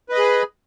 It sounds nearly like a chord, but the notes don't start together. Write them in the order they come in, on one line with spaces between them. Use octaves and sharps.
B4 D#5 B5 G#4